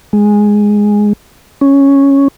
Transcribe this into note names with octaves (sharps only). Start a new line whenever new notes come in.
G#3
C#4